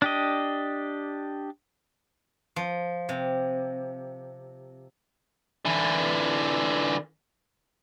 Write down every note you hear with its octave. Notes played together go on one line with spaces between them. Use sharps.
D4 G4 D#5
F3
C3
D3 E3